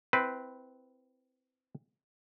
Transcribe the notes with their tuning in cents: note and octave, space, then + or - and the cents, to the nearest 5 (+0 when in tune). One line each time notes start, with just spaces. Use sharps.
C4 -15 E4 +0 B4 +0